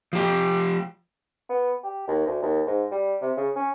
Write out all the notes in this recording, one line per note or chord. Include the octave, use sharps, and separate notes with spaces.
F3 G4
B3
G4
D#2
D2
D#2
G#2
G3
C3
C#3
C#4